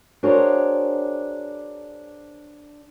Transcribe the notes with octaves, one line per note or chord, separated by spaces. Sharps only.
D4 F#4 G#4 A#4 C5 C#5